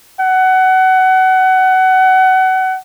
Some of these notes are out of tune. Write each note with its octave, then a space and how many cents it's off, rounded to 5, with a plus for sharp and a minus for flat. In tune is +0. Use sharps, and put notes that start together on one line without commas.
F#5 +25